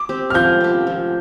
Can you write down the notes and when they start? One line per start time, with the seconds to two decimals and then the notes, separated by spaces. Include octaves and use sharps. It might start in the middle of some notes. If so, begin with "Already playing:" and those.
Already playing: D6
0.09 C4 G4
0.30 F6
0.34 F3 G6
0.61 C4 G4
0.87 F3